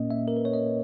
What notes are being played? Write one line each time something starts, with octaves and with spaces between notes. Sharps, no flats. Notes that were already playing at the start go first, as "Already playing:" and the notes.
Already playing: A#2 A#3 C#4 D#5
E5
A#4
B4
C#5
D#5